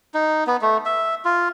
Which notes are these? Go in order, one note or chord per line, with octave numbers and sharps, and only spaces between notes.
D#4
B3
A3
E5
F4